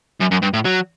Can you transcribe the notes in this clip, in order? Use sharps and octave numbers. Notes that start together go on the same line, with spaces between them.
F#2
F#2
G2
A2
F#3